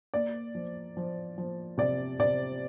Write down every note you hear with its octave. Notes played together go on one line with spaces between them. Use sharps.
A#3 D5
F3
F3
F3
C3 D5
C3 D5